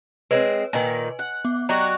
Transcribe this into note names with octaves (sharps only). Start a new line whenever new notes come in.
G#3 B3 C4 B4 C#5
A#2 D#3 B4 D#5 G#5
F#5
B3 D6
F#3 F#4 G4 D5 D#5 A#5